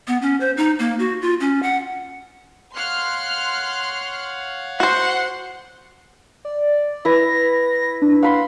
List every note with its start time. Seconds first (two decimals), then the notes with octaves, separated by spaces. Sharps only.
0.08 B3
0.22 C#4
0.40 C5
0.57 D#4
0.79 A#3
0.99 F#4
1.22 F4
1.40 C#4
1.63 F#5
2.75 C#5 F5 F#5 C6 F6 F#6
4.80 F#4 C5 F#5 C6 C#7
6.45 D5
7.05 E4 B4 A#6
8.02 D4
8.23 F5 F#5 B5 C6